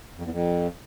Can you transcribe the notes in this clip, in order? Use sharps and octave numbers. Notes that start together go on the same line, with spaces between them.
F2
E2
F2